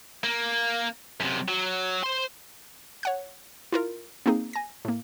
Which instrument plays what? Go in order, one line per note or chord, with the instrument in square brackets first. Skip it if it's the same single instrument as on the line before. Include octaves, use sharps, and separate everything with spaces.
[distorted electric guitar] A#3
F#2 C3
F#3
C5 C6
[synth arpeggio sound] C#5 F#5 F#6
E4 F4 A#4
A#3 C4 D#4 G#4
G#5 A#6
A2 A#3